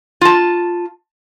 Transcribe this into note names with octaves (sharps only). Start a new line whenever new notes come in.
F4 A5